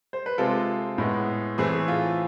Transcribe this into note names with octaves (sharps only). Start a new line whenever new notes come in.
C5
B4
C3 G#3 C4 F4 A4
A2 G#3 B3
A2 E3 A3 C4 G#4
G#4
F4